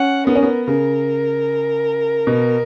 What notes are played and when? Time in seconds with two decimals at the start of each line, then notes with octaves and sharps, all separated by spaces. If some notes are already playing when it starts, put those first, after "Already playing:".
Already playing: C#4 F#5
0.27 B3 A#4
0.36 C#4
0.43 B3
0.67 C#3 A#4
2.27 B2